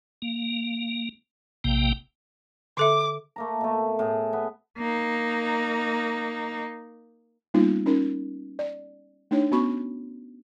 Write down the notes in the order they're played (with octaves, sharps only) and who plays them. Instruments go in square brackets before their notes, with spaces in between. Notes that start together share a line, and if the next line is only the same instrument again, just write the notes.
[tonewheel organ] A#3
A#1 C3 A#3 G5
[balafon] D3 A4 E5 [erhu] D6
[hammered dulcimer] A3 A#3 A#5
B2 A3
A2 G#4
B3
[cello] A#3 D#4
[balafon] G3 A#3 B3 C#4 D#4 F4
C#4 D#4 A#4
D5
A3 D4 D#4 C#5
B3 C#4 F#4 B5 C#6